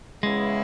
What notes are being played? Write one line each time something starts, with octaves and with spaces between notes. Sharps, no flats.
C#3 E3 G#3 B3 E4